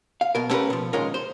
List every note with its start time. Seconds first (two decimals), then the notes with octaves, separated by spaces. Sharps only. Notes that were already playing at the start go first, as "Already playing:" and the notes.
0.21 F5
0.35 B1 B2 A#4
0.49 A3 B3 C#4 G4 A#4 B4
0.70 B2 F3
0.93 A#2 D#3 G#3 C#4 F4 A#4
1.14 C5